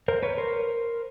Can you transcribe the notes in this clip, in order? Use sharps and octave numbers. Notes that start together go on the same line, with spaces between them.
A#4 C5
B4 C#5
A#4 C5